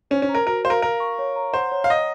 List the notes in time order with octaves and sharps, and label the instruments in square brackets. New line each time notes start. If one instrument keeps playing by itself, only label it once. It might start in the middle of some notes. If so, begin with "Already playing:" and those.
[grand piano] C#4 [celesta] C5
[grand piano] C#4
[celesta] A#5
[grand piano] A#4
[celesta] F#4 [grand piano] A#4
[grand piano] C5 [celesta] F5
[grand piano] A#4
[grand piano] A#4 [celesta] F5
[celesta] C#6
C#5
A#5
[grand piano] C5 [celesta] F#5
[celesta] C#5
[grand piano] F5
[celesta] C#5 [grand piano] D#5